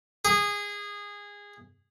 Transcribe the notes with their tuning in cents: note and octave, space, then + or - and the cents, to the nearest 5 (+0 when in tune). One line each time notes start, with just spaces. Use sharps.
G#4 -20